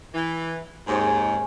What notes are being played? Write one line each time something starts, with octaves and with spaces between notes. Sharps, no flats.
E3
D#2 G#2 G#3 C4 C#4